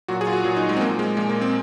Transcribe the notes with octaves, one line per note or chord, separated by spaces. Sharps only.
A#2 F#3 F#4
G#4
F4
F#4
A#2 F#3 F4
D#4
G#3
C4
A#2 F3 A#3
G#3
A#2 F3 G#3
A#3
C4